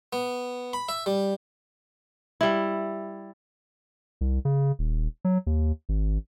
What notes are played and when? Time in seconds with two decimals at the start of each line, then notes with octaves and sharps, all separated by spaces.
0.13 B3
0.73 B5
0.89 E5
1.06 G3
2.41 G3 E4
4.21 C2
4.45 C#3
4.79 D#1
5.25 F#3
5.47 D#2
5.89 G#1